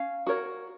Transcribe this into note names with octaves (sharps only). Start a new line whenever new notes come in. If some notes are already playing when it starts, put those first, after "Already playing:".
Already playing: C#4 F5
F#4 A#4 C#5